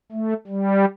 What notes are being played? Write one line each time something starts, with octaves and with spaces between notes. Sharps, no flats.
A3
G3